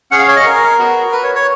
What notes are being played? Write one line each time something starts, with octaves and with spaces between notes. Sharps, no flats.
C#4 G#4 F#5
F5
C#5
D#5
A#4
B3 F#4
B4
C#5
C#5